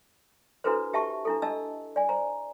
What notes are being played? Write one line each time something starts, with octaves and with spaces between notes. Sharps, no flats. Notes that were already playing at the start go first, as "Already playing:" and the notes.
D4 E4 F#4 A4 B4 C5
G4 E5 A5 C#6
D4 E4 A4
D4 D#5 A5 E6
D5 G#5
C5 A#5